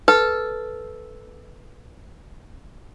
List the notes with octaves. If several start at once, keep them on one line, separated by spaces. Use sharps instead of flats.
A4 B4